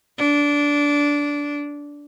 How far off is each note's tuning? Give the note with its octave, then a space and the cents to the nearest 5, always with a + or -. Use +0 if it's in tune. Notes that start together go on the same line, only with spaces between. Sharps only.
D4 -15